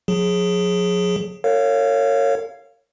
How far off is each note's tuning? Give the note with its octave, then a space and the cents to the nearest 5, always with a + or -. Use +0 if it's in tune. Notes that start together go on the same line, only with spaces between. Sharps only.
F#3 -45 G#4 +0
A#4 -40 C#5 +0 F5 +0